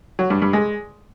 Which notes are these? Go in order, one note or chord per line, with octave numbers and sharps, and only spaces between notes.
F#3
G2
G2
G#3